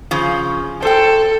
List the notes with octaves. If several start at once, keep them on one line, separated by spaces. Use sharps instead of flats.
C#3 F3
A4 C5 G5